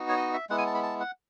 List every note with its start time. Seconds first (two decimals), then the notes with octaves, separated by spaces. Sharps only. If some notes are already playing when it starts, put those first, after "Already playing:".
Already playing: B3 D#4 F#4
0.09 C#5
0.17 D#5
0.34 E5
0.49 G#3 B3 E4 F#5
0.58 G#5
0.67 A5
0.74 B5
0.83 A5
1.00 F#5